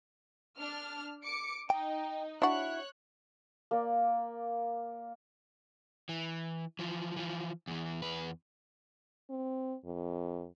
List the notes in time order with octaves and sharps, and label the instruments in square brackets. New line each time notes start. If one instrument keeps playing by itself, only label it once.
[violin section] D4 F6
D6 C#7 D7
[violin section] D#4 [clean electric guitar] G5
[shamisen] D4 F#4 [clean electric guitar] E4 [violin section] C#5 F#6
[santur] A#3 D5
[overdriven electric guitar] E3
E3 F3
E3 F3
E2 E3
E2 B4
[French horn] C4
F2